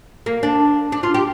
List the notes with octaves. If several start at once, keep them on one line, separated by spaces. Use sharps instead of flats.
A#3
D4
D4
F4
G4